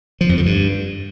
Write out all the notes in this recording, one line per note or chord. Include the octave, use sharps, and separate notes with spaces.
F3
F2
D3
G2